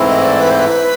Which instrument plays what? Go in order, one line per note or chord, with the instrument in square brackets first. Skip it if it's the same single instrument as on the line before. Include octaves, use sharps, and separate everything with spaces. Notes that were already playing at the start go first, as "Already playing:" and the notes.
Already playing: [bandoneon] G#2 E3 A3 C4 E4
[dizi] D#5
D5
B4
C5
B4